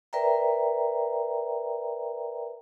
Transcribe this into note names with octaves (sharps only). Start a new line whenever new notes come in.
A#4 B4 D5 E5 G5 A#5